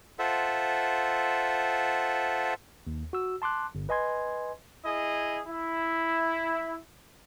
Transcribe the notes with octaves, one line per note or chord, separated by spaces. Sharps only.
F4 A4 C5 E5 F#5
D#2
F#4 E6
A5 C6 D6 F#6
G1
B4 D#5 G#5 C6 G#6
E4 G#4 D#5
E4